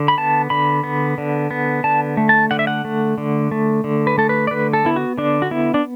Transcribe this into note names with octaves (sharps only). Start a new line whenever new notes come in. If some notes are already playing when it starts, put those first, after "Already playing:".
Already playing: D3
B5
B3 A5
D3 B5
B3
D3
B3
D3 A5
A3
A5
D3 F#5
E5
F#5
A3
D3
A3
D3
B4
A3 A4
B4
D5
D3 B4
A4
B3 E4
F#4
D3 D4
F#4
B3 E4
D4